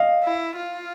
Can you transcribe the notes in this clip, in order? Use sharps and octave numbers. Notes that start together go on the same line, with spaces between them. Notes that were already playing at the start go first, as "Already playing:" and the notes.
Already playing: D#5 F5
E4
F4